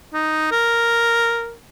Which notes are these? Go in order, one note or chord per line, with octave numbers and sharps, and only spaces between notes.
D#4
A#4